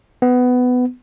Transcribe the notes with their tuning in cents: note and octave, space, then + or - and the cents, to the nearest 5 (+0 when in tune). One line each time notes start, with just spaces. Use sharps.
B3 +15